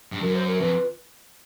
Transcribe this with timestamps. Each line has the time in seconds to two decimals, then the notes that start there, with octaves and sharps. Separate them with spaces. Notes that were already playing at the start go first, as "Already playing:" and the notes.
0.12 G2
0.22 F#2 A#4
0.35 C5
0.48 A#4
0.60 F2 B4